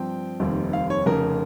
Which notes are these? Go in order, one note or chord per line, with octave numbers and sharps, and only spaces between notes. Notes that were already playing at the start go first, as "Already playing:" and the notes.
Already playing: G2 F3 C4 G5
F1 D#2 D#3 G3 C4
F5
C#5
F1 F2 C#3 A#4